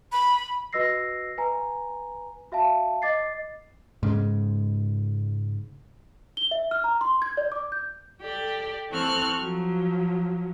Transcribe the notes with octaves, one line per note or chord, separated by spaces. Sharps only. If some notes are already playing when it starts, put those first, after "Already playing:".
B5
F#4 B4 D#5 E6 A#6 C7
B4 G#5 A#5
F#4 E5 F5 A5
D#5 D6 A6 C7
G#2 C#3 G#3
G7
E5
F6
A#5
C6
G#6
D5
D6
G6
G4 A4 D5 G5
E3 C4 A4 C#6 F6 F#6
F3 F#3